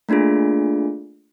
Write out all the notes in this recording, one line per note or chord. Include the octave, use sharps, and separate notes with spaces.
A3 A#3 D4 F4 G#4